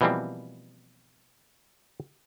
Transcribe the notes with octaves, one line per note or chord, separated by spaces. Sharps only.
B2 E3 F3 G3 A#3 C4